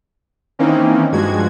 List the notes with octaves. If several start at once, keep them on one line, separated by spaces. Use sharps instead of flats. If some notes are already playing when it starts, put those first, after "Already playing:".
D#3 E3 A#3 C4 C#4 D#4
G2 F3 G#3 F#4 G#6